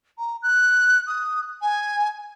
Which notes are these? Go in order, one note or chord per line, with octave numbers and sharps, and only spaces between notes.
A#5
F#6
D#6
G#5